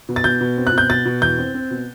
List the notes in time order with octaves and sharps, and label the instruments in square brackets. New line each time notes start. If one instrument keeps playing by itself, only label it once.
[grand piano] B2
A6
B2 G6
B2
C4
F#6
B2 G6
B2 A6
B2
E2 G6
C4
C4
B2